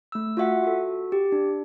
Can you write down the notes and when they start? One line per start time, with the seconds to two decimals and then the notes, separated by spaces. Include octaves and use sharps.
0.12 A3 E6
0.37 F4 F#4 E5 F#5
0.63 F#4 A4
1.12 G4
1.32 D4